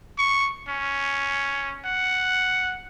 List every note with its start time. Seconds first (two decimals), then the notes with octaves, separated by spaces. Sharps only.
0.18 C#6
0.68 C#4
1.85 F#5